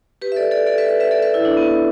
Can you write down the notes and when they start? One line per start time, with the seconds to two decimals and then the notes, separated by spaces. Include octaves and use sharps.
0.21 G4 B4
0.32 E5
0.36 A4 D5
0.51 A4 D5
0.67 A4 D5
0.78 B4 E5
0.89 A4 D5
1.00 B4 E5
1.11 A4 D5
1.23 B4 E5
1.34 E4 A4
1.45 D4
1.57 B3